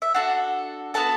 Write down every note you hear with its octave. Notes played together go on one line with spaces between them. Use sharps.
E5
D4 F#4 A4 F#5
B3 F#4 A4 A5